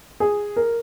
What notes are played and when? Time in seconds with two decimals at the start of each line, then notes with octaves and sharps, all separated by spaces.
0.20 G#4
0.56 A#4